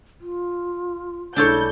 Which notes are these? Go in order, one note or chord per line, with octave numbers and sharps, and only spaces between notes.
F4
B1 G#3 D4 E4 A4 C#5 G6